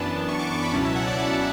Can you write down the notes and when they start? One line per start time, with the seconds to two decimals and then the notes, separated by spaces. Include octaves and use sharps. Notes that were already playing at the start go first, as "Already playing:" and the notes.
Already playing: F#2 E3 B3 D4 A5
0.28 C#6
0.39 D6
0.51 C#6
0.62 B5
0.73 C#2 B2 F#3 C#4 E4 A5
0.85 E5
0.96 F#5
1.07 D5
1.19 D5